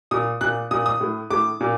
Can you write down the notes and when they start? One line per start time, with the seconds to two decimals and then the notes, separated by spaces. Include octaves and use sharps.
0.11 A#2 D#6
0.41 A#2 F#6
0.71 A#2 D#6
0.86 D#6
1.01 A2
1.31 A2 D6
1.61 A#2